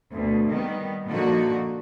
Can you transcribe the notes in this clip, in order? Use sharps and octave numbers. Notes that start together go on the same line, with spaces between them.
D2 B2
D#3 G3 B3
A#2 D3 F3 D#4 F#4